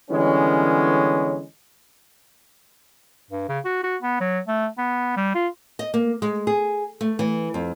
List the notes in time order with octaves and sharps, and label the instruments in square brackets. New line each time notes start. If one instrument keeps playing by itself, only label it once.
[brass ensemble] D3 E3 G3 G#3 B3 C#4
[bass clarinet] G2
C#3
F#4
F#4
B3
F#3
A3
B3
G3
F4
[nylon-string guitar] D#5
A#3
G#3
G#4
A3
E3
F2